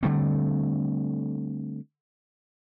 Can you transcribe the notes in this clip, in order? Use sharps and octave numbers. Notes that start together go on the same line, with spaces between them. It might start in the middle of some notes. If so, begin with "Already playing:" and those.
D3 G3 A3 C4